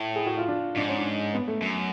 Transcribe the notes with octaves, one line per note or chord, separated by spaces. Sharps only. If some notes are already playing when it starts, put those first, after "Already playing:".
Already playing: A2
G#4
F#4
F4
D4
G#2 D4
C#4
D4
B3
A3
F#2